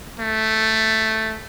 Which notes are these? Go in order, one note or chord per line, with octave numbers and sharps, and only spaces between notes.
A3